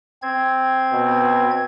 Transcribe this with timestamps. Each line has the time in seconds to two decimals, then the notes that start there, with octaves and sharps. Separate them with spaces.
0.22 C4 G#6
0.92 B2